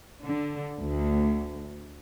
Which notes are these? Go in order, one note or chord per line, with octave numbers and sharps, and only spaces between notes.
D3
D2